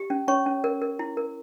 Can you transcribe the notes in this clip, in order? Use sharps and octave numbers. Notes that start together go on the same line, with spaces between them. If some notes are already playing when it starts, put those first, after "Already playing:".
Already playing: G4
C#4
C#4 C#5 C#6
C#4
A#4
A#4
E4
A#4